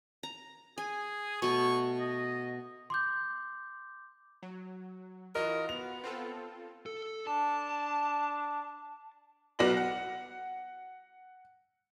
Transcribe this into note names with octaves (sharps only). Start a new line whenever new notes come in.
A#5
G#4 G#5
B2 A3 C#6
D#5
C6 D6 G6
F#3
E3 F4 F#4 A#4 D#5
B3 F7
C4 F4 A4
A4
D4 A5
B1 F#3 B3 D5 A#6 F#7
F#5